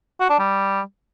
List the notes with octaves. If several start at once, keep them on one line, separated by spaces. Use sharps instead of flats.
F#4
D4
G3